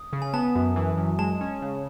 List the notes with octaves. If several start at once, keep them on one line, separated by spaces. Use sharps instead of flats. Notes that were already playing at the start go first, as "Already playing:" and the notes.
Already playing: D#6
C#3
G#5
B3 A5
F#2
E3
F#2
G#3 A5
C#4
C#3